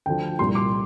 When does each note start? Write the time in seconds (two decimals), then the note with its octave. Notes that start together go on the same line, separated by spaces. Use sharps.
0.06 D2 D3 F3 G5
0.39 C2 A#2 G3 C6
0.55 D6